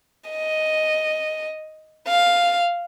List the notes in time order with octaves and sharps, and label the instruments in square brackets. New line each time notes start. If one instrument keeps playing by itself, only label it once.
[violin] D#5
F5